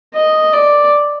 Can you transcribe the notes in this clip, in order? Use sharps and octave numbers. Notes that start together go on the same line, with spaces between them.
D#5
D5